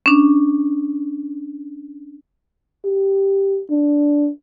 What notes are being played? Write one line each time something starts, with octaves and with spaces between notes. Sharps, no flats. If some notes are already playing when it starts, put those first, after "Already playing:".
C#4 D4
G4
D4